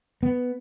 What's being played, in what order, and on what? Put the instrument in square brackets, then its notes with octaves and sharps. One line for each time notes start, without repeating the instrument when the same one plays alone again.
[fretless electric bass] B3